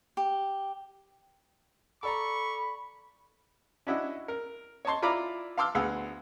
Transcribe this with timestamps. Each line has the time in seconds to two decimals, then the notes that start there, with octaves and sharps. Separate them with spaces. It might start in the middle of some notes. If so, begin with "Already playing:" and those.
0.17 G4
2.03 A4 D5 A#5 B5 C#6
3.87 C#4 D4 E4 F#4 D#5
4.28 A#4
4.85 C#5 D#5 A5 C6
5.02 E4 F4 D5 A#5 B5 D6
5.57 F5 A5 C6 D6 E6 F6
5.75 D2 B3 G#4 F5 F#5 E6